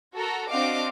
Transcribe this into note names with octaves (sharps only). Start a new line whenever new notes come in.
F#4 A4 A#4 A#5
C4 D4 F#4 D#5 F5 D6